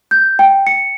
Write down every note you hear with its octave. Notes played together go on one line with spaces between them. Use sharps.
G6
G5
C#7